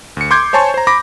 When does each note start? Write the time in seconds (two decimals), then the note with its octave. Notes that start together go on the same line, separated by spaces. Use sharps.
0.17 D2 C#7
0.31 C6 D6 G6 G#6
0.53 C5 C#5 G#5 A5 C6 C#6
0.74 C5 A#5
0.87 B5 D6 A#6